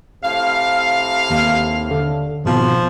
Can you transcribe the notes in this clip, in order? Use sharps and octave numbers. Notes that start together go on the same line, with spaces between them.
A2 C3 F5
D#2
D3
G#1 B2 F3